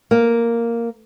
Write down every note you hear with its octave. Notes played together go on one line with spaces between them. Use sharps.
A#3